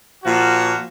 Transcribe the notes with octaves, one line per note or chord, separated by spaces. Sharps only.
A#2 F3 F#4